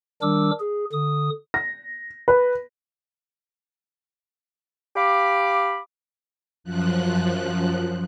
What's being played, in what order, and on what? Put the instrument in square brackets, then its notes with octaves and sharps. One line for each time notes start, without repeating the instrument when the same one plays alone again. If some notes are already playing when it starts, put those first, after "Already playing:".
[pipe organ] D#3 G3 D4 A#4 D6 E6
G#4
D3 D#6
[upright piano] A#6
B4
[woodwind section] G4 F5 B5 D6
[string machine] F#2 F3 F#6